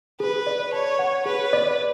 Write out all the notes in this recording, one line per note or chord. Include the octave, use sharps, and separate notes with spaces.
G#4 B4
D5
C#5 A5
F#5
G#4 B4
D5